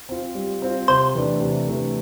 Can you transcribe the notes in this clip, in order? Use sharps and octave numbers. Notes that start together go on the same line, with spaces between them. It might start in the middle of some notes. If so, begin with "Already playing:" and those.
C4 F4
G3
C4 F4
C3 C5
E3 A3 D4
C3
E3 A3 D4